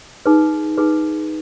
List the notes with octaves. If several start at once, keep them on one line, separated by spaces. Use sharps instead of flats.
D#4 G#4 B4
D#4 G#4 B4